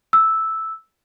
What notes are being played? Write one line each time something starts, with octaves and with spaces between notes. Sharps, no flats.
E6